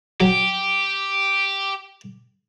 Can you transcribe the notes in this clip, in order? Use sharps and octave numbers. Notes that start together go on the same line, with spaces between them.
F#3 G4